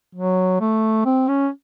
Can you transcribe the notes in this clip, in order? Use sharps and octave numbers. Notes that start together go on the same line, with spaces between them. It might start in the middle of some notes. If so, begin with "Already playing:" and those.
F#3
A3
C4
C#4